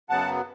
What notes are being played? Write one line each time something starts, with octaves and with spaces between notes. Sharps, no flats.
F#2 C#3 F#3 B3 F#5 A5